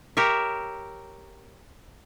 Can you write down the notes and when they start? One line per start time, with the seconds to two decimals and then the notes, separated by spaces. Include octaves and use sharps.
0.17 G4 A#4 C#5 E5